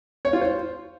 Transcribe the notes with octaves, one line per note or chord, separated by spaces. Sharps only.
C#5
F4
C5